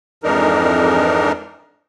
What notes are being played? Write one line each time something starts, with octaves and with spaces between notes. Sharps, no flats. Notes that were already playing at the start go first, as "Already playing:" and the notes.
F2 G#2 E3 D4 D#4 A#4